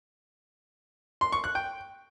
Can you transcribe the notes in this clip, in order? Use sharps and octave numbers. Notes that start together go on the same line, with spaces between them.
C6
C#6
F#6
G5